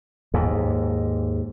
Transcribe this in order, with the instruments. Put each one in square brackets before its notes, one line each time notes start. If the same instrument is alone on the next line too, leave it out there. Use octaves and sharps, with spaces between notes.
[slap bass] D#2 G#2